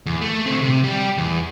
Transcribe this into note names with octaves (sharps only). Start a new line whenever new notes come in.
E2
A3
D2 C4
C3
G3 G4
E2